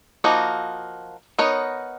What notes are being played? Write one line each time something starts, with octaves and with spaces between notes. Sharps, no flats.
F3 A#3 D#4 F#4
B3 D#4 A#4 C#5